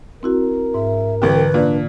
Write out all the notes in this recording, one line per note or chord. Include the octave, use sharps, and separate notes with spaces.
C4 E4 F#4 A#4
G#2 E5
C2 D3 E3 G4 B4
A#2 D4 D5